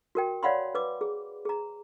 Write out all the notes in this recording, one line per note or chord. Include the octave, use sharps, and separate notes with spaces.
F#4 A#4 G5
C#5 D5 F5 F#5 B5 C6
B4 D6
G#4
G#4 A#5